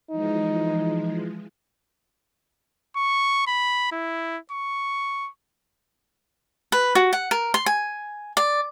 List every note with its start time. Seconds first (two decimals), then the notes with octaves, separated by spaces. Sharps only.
0.11 E3 F3 G#3 D#4
2.96 C#6
3.47 B5
3.92 E4
4.52 C#6
6.72 B4
6.95 F#4
7.13 F#5
7.31 A#4
7.54 C6
7.66 G#5
8.37 D5